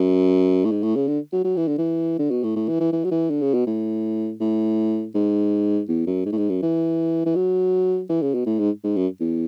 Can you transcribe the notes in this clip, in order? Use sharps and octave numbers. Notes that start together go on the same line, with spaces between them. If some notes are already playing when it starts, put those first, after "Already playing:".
Already playing: F#2
A2
G#2
A2
C#3
D3
F#3
F#3
E3
D3
E3
D3
B2
A2
A2
E3
E3
E3
F#3
E3
D3
C#3
B2
A2
A2
G#2
E2
F#2
G#2
A2
G#2
F#2
E3
E3
F#3
E3
C#3
B2
A2
G#2
G#2
F#2
E2